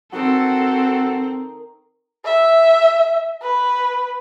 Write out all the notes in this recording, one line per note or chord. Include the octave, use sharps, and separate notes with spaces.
D#3 C4 F#4 A4
E5
B4